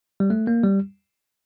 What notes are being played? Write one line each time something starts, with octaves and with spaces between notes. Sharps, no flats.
G3
A3
A#3
G3